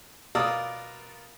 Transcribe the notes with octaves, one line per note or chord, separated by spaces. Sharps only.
B2 F4 A#4 D5 D#6 E6